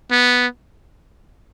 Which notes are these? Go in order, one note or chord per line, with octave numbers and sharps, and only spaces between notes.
B3